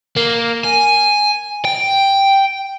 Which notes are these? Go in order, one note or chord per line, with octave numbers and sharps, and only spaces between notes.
A#3
G#5
G5